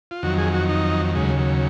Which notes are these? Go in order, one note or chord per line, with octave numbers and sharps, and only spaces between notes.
F4
F2 D#3 F#3 F#4
G#4
F#4
D#4
D#2 C#3 F#3 G#3
F#3